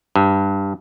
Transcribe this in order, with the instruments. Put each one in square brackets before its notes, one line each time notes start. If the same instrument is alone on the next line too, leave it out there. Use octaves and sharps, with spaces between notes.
[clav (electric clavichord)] G2